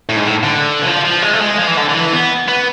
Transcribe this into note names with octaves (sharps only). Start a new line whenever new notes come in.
A2
G#2
A2
D3
E3
F3
F3
G#3
A3
G#3
F3
E3
D3
D3
E3
B3
B3